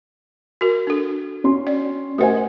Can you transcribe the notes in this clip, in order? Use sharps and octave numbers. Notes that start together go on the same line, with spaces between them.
F#4 A#4
D4 A4
C#4 F#4 C6
D5
A3 A#4 C5 F#5 G#5